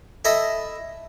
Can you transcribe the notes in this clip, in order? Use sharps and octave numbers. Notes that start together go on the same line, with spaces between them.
E4 A4 D#5 E5